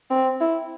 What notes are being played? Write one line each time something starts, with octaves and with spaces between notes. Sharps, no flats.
C4
E4